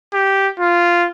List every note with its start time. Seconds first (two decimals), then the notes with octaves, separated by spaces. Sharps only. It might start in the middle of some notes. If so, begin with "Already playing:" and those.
0.13 G4
0.60 F4